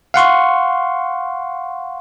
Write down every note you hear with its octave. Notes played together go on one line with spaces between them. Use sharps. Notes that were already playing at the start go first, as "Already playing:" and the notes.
F5 F#5 C6 C#6